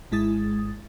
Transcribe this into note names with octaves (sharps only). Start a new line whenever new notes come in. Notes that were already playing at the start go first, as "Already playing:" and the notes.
G#1 G#2 G#3 E4 D#6 A6